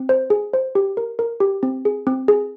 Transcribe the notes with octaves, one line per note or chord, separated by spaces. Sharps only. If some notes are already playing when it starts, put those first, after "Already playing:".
Already playing: C4
C5
G#4
C5
G4
A#4
A#4
G4
C4
G#4
C4
G#4